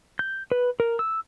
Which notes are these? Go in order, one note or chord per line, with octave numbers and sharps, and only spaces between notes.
G6
B4
A#4
E6